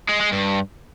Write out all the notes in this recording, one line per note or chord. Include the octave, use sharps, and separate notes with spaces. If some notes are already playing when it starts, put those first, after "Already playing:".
G#3
G#3
G2